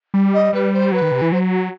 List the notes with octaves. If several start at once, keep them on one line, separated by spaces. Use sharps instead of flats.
G3
D#5
G3 B4
C5
F#3 B4
D#3
C3
E3
F#3 C5